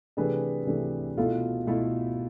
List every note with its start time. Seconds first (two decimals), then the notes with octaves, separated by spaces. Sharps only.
0.17 C3 E3 A3 D4 G#4 B4
0.67 C3 E3 A3 D4
1.17 B2 A3 E4 F4 A4
1.67 B2 A3 E4 F4 A4